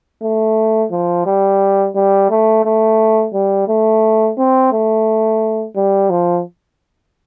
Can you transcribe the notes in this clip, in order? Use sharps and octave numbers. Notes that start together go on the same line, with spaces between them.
A3
F3
G3
G3
A3
A3
G3
A3
C4
A3
G3
F3